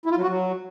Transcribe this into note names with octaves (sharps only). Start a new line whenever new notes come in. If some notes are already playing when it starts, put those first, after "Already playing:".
E4
F4
F#3
F#4
F#3